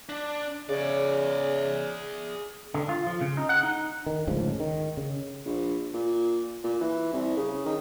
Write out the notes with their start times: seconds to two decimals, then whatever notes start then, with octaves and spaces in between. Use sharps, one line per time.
0.09 D4
0.69 C#3 G#4 D5
2.74 D3
2.89 F4
3.07 F3
3.21 C#3
3.37 D#4
3.49 F#5
3.63 D#4
4.06 D#3
4.27 D2 G#2 C#3 F3
4.60 D#3
4.97 C#3
5.46 A#1
5.94 A#2
6.64 A#2
6.81 E3
7.13 C2
7.37 C#3
7.66 D#3